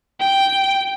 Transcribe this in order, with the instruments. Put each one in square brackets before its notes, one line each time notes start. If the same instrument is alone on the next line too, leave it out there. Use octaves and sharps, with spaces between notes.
[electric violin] G5